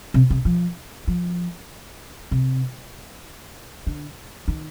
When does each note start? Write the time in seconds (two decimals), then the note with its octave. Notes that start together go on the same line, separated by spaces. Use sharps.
0.14 C3
0.30 C3
0.45 F3
1.08 F3
2.31 C3
3.87 D3
4.48 D#3